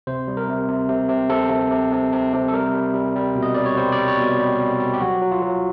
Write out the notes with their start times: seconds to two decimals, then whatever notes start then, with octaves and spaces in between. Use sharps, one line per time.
0.07 C3 C5
0.28 G3
0.37 A#4
0.48 C3
0.68 C3
0.89 C3
1.09 C3
1.30 C3 A4
1.50 C3
1.71 C3
1.92 C3
2.13 C3
2.33 C3
2.48 A4
2.53 G3 A#4
2.74 G3
2.94 G3
3.16 G3
3.35 B2
3.43 D#5
3.54 G3 D5
3.66 C#5
3.77 G3 C5
3.92 D5
3.98 G3
4.08 C#5
4.18 B2
4.23 G4
4.39 G3
4.60 G3
4.80 G3
4.93 G4
5.01 F#3 F#4
5.22 F#3
5.32 F4
5.42 F#3